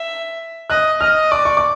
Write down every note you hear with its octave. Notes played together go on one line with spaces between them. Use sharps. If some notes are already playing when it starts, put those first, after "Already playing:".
Already playing: E5
D#5 F#6
D#5 F6
D5 D6
C#6
D6